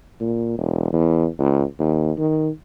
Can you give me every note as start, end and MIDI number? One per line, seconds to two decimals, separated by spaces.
0.20 0.55 46
0.58 0.92 28
0.92 1.27 40
1.39 1.64 37
1.79 2.12 39
2.17 2.49 51